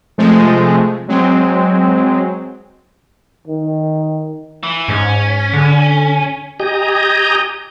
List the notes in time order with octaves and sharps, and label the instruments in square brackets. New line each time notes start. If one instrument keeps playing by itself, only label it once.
[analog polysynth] C3 F3 G#3 A3
F#3 G#3 C4
[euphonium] D#3
[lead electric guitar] E3
[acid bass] G#2 [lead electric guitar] C#4
[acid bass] D3
[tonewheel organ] G4 D#5 G#5 A#5 D#6 G6